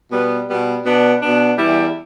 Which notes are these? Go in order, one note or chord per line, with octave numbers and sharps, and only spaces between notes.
B2 G3 B3
B2 G3 B3
B2 B3 D4
B2 B3 D4
E2 E3 G3 E4